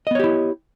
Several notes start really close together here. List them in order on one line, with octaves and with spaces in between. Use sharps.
D#5 B3 C#5 G4 E4